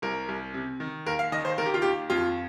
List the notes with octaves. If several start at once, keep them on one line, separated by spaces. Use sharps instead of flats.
C2 A#4
C2
C3
D#3
D#2 A#4
F5
D#3 D#5
C5
D#3 A#4
G4
F4
D#2 G4
F2 F4